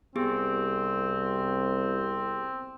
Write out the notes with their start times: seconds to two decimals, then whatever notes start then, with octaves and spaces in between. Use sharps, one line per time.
0.16 C2 B3 C4 G4 G#4